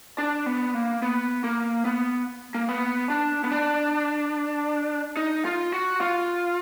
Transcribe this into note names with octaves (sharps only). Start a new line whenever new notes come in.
D4
B3
A#3
B3
A#3
B3
A#3
B3
D4
B3
D4
D#4
F4
F#4
F4